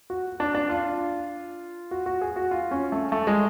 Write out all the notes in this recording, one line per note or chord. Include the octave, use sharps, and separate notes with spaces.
F#4
D4
D4
F4
F#4
F#4
G#4
F#4
F4
C#4
A3
A3
G#3